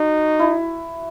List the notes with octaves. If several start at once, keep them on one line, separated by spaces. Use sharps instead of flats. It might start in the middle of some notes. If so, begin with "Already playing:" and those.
Already playing: D#4 F#4
E4